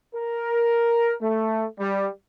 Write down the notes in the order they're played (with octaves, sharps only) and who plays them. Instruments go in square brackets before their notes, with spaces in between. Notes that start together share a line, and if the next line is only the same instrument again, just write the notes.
[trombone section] A#4
A3
G3